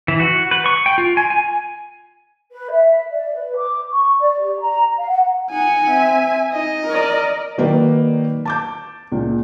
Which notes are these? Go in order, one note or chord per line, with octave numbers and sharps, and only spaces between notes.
E3
F#4
B4
C#6
G5
F4
G#5
G#5
B4
E5
D5
B4
D6
C#6
D5
G4
A#5
F5
F#5
D#4 F#5 G#5
C4 E5
D#4 D#5
A#4 D5
D#3 F#3 A#3 D#4 B4 D5
A5 D6 G6
C#2 A#2